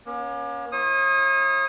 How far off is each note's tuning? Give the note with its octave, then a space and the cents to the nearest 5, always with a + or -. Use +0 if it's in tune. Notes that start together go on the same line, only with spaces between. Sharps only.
A#3 +45 C#4 +0
E4 +0 C#5 -40 D#6 +0